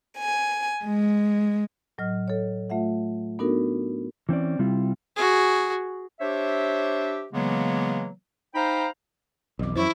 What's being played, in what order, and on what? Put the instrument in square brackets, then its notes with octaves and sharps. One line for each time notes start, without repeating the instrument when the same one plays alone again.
[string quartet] G#5
G#3
[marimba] A2 F#3 D#5 F6
A4 C#5
A3 F4 E5 F#5
B3 D4 D#4 F#4 A4 A#4
[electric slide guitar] E3 C4 C#4 D5
C3 G3 C4 E4 F4
[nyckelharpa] F#4 G#4
[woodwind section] D4 G4 C5 C#5 E5
C#3 E3 F#3 G#3 A#3 B3
D#4 C5 F5 G5 A#5 B5
[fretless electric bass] B1 F2 [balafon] E3 F3 D6
[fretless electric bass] F#2 [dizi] E4 [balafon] C5 C#5 C#6